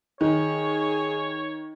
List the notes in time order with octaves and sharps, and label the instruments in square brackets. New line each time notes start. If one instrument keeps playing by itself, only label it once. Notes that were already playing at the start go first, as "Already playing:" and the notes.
[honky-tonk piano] D#3 [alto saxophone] G#4 [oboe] C#5